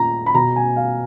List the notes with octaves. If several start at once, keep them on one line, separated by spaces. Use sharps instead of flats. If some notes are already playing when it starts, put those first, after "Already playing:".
Already playing: A#2 A#5
B5
B2 A#5
G#5
F5